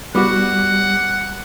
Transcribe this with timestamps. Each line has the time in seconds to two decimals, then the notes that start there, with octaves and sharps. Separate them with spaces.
0.15 G3 B3 F#4 F#5 D6